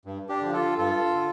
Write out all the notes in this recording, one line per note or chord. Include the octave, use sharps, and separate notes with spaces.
G2
D4 G4
D3 F3
F4 A4
G2 F4 A4
D3